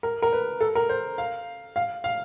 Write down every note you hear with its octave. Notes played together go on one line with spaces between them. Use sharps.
A#4
A#4
B4
A4
A#4
C5
F5
F5
F5